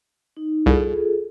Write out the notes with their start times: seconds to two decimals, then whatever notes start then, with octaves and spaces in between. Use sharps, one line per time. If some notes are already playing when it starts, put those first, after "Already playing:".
0.37 D#4
0.66 C2 F4 G#4 A4